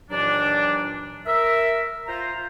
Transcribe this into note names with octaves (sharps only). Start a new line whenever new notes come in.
D#2 A#2 E3 F#3 D4
A#4 E5
F4 C5 A#5